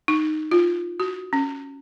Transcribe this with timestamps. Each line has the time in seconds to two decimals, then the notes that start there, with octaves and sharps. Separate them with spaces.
0.08 D#4
0.51 F4
1.00 F#4
1.33 C#4